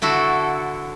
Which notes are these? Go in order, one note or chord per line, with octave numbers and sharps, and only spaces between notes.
D3 E4 F#4 A4